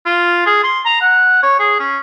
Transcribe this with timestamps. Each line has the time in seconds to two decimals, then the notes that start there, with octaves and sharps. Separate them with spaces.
0.06 F4
0.46 G#4
0.63 C6
0.85 A#5
1.01 F#5
1.43 C#5
1.60 G#4
1.80 C#4